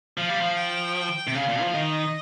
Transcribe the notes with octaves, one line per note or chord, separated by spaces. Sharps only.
F3 F5
G3
F3
G5
C3
C#3 F5
A#2
F3
D#3 D#5